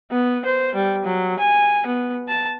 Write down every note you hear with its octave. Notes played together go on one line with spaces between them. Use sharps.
B3
C5
G3
F#3
G#5
B3
A5